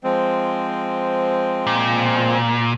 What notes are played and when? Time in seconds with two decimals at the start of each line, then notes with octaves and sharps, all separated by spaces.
0.04 F3 G#3 C4
1.67 A#2